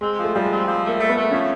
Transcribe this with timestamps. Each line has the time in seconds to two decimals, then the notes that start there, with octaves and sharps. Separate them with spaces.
0.01 G#3 C4
0.18 F3
0.23 A3
0.33 F3 G3
0.45 G#3
0.50 C4
0.66 F3
0.83 A3
0.88 A#3
0.99 A3
1.09 B3
1.16 A3
1.31 F3 C#4